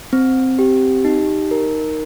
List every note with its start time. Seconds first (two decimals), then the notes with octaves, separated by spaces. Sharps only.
0.13 C4
0.59 G4
1.05 D#4
1.51 A#4